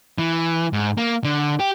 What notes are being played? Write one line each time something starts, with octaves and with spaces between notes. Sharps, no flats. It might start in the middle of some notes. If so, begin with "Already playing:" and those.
E3
G#2
A#3
D3
G4